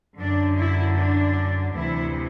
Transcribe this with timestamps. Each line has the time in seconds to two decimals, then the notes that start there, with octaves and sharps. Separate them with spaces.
0.19 F#2 D3 D4
0.59 E4
0.97 D4
1.74 D2 C3 E3 E4